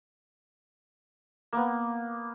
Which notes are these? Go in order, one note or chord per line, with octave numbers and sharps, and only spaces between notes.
A#3 B3